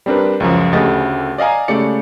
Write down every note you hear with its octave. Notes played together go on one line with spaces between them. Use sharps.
G3 C4 D4 A#4 B4
C#2 F#2 F3
D2 C#3 A3 G4 D#5 A6
D5 D#5 F5 G#5 A#5
C#3 G#3 A3 G4 D5 C#7